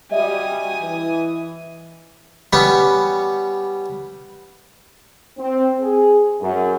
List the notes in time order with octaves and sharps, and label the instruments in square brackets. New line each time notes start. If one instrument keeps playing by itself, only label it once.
[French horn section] G3 F#4 [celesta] D#5 E5 [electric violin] G#5 D#6
[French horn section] E3
[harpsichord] G3 B3 C#4
[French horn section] C4
G#4
F#2